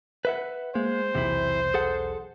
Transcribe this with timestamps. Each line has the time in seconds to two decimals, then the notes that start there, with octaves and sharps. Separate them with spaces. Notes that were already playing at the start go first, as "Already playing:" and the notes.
0.25 B4 E5 F#5
0.75 G#3 A#3 C5
1.15 B1 E2 C3 E3 E4
1.74 G#4 A4 F#5